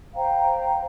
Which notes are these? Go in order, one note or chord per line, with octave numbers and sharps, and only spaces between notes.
C5 F5 G5 A#5